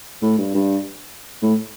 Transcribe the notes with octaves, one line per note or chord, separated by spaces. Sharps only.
A2
G2
G2
A2